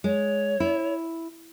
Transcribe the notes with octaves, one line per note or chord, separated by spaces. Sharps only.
G#3 C#5
E4